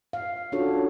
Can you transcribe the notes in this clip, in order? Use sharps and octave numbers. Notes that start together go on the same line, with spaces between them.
F5
C#4 D4 F4 F#4 A4 C#5